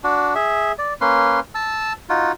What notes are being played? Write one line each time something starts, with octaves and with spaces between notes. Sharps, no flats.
D4 F#4
G#4 E5
D5
A#3 C#4 B4 C6
A5 E6
D#4 F4 F#4